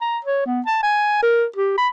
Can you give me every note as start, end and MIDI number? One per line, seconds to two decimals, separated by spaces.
0.01 0.19 82
0.25 0.45 73
0.46 0.61 59
0.66 0.80 81
0.83 1.18 80
1.23 1.45 70
1.56 1.75 67
1.78 1.88 83